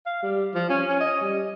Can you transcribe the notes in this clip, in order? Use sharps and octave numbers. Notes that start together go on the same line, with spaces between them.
F5
G3
F3
C#4
C#4
D#5
G3